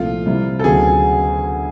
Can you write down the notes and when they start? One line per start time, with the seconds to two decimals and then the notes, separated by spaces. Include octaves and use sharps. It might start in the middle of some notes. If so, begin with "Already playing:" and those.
Already playing: C2 A#2 F3 A3 C4 F4
0.26 C3 D#3 G3 C4 E4
0.59 A4
0.64 D2 C#3 F#3 B3 G#4